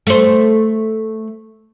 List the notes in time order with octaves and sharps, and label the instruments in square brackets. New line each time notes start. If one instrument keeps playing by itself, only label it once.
[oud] A3 C5